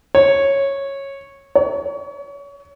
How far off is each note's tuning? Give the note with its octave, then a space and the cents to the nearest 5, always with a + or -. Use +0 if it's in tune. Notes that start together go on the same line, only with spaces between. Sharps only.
C#5 -10
C#5 +30